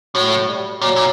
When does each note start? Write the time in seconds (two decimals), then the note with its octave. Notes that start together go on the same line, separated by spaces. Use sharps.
0.15 A2 F#3
0.49 G3
0.81 A#2 F#3
0.96 A#2